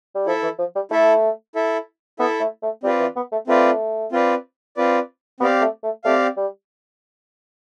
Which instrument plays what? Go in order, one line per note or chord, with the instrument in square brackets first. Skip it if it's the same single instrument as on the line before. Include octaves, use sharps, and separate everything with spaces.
[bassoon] G3
[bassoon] F3 [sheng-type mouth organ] E4 A4 E5
[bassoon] E3
F3
G3
[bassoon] A3 [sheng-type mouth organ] E4 A4 E5
[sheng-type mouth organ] E4 A4 E5
[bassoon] B3 [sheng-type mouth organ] E4 A4 E5
[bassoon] A3
A3
[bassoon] G3 [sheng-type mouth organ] C4 F4 B4 D5
[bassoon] E3
B3
A3
[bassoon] A3 [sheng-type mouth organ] C4 F4 B4 D5
[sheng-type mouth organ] C4 F4 B4 D5
C4 F4 B4 D5
[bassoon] B3 [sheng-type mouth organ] C4 G4 D5 F5
[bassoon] A3
A3
[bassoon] A3 [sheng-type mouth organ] C4 G4 D5 F5
[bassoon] G3